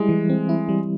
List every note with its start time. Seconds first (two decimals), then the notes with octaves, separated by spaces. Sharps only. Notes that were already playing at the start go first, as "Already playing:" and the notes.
Already playing: G3 G#3 E4
0.09 E3
0.29 C4
0.49 E4
0.69 G3